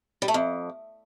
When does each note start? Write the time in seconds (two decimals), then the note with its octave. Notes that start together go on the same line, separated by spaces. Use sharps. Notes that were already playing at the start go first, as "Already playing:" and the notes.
0.22 G3
0.28 A3
0.34 F2